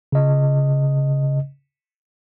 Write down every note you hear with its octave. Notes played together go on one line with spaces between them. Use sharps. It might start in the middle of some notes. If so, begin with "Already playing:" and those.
C#3 D#5